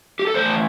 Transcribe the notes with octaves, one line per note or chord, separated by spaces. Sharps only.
G4
A4
A2 E3 C5